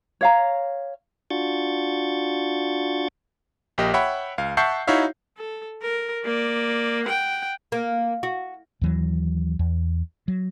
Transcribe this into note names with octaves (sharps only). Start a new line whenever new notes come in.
C#5 F5 A#5
D4 F4 F#4 C#6 G6 A6
A#1 A#3 G4 D#5
C#5 E5 F#5 G5 B5
C#2 F5
E5 F#5 A5 C#6 G6 C7
D#4 E4 F#4 C#5 E5 F5
A4
A#4
A#3 D5
F#5 G5
A#3
F#4
D#2 E3 F#3
E2
F#3